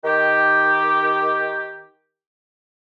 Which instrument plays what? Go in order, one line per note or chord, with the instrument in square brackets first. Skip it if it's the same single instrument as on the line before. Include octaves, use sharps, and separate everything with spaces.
[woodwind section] D#3 G4